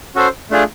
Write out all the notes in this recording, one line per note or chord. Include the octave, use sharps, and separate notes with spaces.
C#4 F#4 A4 C5
A3 D4 F4 G#4